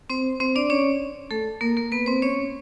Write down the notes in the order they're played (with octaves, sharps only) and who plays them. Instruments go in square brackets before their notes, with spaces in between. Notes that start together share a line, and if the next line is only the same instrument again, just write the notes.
[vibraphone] C4 C5
C4 C5
D4 D5
C#4 C#5
A3 A4
A#3 A#4
A#3 A#4
B3 B4
C4 C5
C#4 C#5